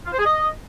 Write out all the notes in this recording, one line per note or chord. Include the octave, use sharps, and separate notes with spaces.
F4
C5
G#4
D#5